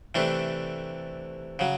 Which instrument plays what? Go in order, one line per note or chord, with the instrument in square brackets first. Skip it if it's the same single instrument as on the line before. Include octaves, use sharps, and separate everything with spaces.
[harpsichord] C3 E3 A3 D4
C#3 F#3